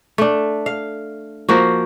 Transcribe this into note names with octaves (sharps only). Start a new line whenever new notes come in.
A3 D4
F5
F3 A#3 F#4